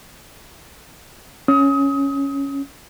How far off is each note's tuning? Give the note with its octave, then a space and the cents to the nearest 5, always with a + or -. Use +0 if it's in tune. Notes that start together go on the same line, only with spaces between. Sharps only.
C#4 +0 D#6 +30